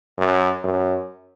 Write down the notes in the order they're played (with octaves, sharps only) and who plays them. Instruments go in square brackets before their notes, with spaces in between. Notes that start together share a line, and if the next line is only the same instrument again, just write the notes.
[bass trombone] F#2
F#2